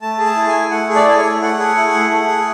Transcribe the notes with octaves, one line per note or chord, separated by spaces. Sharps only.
A3 A5
G#4
A5
E4
G#5
A3
A3 F#5
G#4
D5
E4
C#5
A3
A3 F#5
G#4
E4
A3
A3
G#4